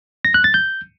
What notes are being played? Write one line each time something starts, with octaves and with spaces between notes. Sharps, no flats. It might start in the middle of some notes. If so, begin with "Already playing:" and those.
A#6
F#6
A6
G6